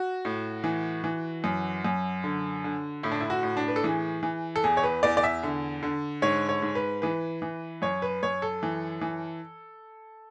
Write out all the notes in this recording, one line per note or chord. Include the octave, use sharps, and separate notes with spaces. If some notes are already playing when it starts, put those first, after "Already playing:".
Already playing: F#4
A2
E3
E3
F#2
F#2
D3
D3
A2 E4
D4
E4
F#4
A2
D4
B4
A4
E3 G#4
E3
A4
E2 G#4
C#5
B4
E2 D5
D5
E5
D3
D3
G#2 C#5
C#5
G#2
B4
E3 B4
E3
F#2 C#5
B4
F#2 C#5
A4
E3
E3